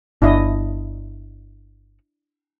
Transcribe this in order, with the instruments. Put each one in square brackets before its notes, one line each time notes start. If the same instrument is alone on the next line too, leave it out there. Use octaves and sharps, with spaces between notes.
[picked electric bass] G1 [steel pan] D4 E4 D#5